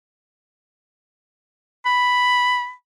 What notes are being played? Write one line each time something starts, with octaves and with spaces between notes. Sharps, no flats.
B5